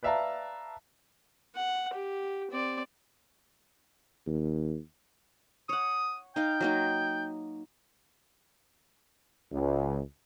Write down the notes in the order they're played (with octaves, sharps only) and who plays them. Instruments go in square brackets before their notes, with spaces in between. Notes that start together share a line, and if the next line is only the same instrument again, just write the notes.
[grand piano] B4 D5 E5 F5 A5 A#5
[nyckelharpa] F#5
G4
C4 D5
[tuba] D#2
[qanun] C#5 F#5 [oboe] D#6
[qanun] D#4 F5 [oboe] G5
[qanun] F#3 A#3 D#4
[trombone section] C#2